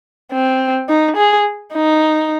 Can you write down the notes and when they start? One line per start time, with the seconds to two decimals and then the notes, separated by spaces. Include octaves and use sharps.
0.32 C4
0.89 D#4
1.17 G#4
1.74 D#4